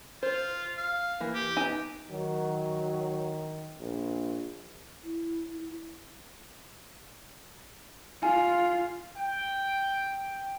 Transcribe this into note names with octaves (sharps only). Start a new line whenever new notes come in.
F4 C5
F5
E3 A#3
G4
B3 D#4 G#5
D#3 F#3
A#1
E4
F4 G#5
G5